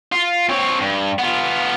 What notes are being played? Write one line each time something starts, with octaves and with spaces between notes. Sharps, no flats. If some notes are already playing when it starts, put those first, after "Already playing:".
F4
C4 C#5
G2
B3 F4